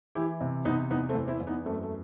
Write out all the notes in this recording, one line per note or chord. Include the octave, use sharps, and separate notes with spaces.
E3 E4 G4
C3
C3 B3 D#4
E2 B3 D#4
A3 C4
E2
C4 E4
E2
B3 D#4
F#2 A3 C4
A3